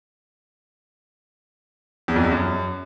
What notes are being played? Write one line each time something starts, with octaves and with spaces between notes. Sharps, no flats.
E2
F2
E2
F#2